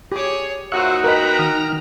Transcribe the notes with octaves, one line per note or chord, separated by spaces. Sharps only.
G4 G#4 C#5 D6
D#2 D#4 F4 F#4 C5 E5 F#5 C#6
A#4 B4 D#5 G5 A#5 B5 F#6
D#3 D#6 F6